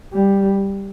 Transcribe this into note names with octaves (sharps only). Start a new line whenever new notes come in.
G3